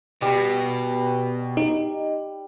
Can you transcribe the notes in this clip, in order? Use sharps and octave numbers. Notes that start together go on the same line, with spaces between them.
B2 G3
D#4